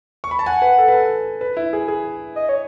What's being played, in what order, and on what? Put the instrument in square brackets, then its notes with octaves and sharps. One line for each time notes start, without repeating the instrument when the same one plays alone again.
[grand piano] C#6
B5
A5
[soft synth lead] F#5 [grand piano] G#5
[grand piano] B4
A4
B4
A4
B4
E4
G#4
G#4
[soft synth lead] D#5
C#5